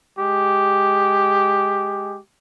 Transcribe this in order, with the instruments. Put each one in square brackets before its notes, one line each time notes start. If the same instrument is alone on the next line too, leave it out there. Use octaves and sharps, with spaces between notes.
[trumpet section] G#3 G4